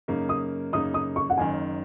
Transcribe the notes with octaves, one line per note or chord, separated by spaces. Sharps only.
F#2 C#3 A#3 D#4
D#6
F#2 C#3 A#3 D#4 D#6
D#6
C#6
F#5
F#1 F#2 D#3 G#5